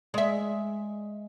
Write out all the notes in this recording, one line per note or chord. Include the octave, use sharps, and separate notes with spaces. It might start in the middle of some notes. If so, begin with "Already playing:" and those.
G#3 E5